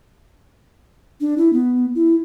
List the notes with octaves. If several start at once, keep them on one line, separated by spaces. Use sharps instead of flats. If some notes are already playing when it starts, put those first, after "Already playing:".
D4
E4
B3
E4